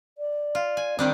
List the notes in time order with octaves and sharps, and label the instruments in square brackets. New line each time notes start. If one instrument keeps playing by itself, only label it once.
[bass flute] D5
[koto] F4
G#5
[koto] D#3 G3 D4 [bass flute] C4